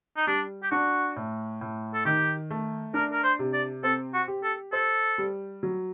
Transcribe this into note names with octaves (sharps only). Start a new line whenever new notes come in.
D#4
G3 D4
G4
D4 F#4
A2
A2
A4
D#3 G4
A3
D4 A#4
A#4
C5
C3
D5
C4 A4
F#4
G4
A4
A4 C5
G3
F#3